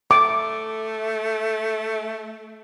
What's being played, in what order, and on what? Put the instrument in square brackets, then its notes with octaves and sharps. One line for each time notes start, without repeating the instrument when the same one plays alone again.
[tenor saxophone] A3 [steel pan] D6